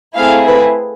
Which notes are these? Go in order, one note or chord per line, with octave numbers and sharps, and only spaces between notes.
A3 C4 E4 G#4 F5
B4